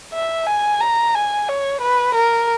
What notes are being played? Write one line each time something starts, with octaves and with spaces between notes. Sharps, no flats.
E5
G#5
A#5
G#5
C#5
B4
A#4